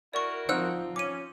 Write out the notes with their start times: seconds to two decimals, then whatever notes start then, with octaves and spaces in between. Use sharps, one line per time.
0.14 E4 F#4 A#4 D5 C#6
0.49 F3 C4 D#4 F5 F#5 E6 F#6
0.96 C#4 D6 D#7